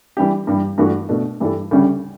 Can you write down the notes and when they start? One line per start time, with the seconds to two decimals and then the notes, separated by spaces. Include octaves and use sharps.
0.17 E3 G3 D4 G4
0.47 G2 E3 G3
0.78 G2 E3 A3 D4 F#4
1.09 B2 A3 D4
1.40 G2 E3 G3 D4 A4
1.71 D2 C#3 G3 C#4